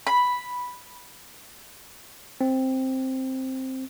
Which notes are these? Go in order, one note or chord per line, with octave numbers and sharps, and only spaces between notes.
B5
C4